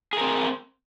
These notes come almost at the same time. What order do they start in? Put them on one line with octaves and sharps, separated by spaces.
G#4 A#4 C4